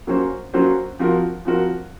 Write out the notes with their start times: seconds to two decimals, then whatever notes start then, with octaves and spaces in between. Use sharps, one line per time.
0.07 F#3 A#3 C#4 F#4 C5
0.54 F#3 A#3 C#4 F#4 C5
0.99 F3 C4 F#4 A#4
1.45 F3 C4 F#4 A#4